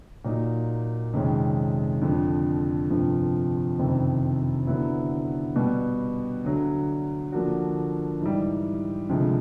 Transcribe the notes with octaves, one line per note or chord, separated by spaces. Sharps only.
A#2 F#3 A#3 D#4
F2 C3 D#3 G#3 C#4
F2 D3 F3
G1 F2 C3 F3
F#1 F2 C3 D#3
D3 F#3 B3 E4
B2 G3 B3
D2 D3 F#3
D3 F3 A#3 D4 F#4
G#2 E3 G3
D2 C3 F3 G#3